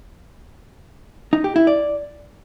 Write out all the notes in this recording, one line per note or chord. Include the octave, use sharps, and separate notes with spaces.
D#4
G4
E4
D5